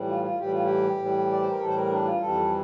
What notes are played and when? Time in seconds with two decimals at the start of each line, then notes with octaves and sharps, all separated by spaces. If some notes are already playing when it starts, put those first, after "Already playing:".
Already playing: A2 E3 G3
0.09 F4
0.23 F4
0.39 A2 E3 G3 G4
0.52 F4
0.64 G4
0.99 A2 E3 G3
1.31 D5
1.41 C5
1.50 A#4
1.60 A2 E3 G3 A4
1.68 C5
1.76 A#4
1.91 D4
2.05 F4
2.21 F2 E3 G3 A4